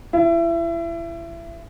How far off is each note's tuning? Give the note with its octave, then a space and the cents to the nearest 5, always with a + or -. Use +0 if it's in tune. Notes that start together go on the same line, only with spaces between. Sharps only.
E4 +30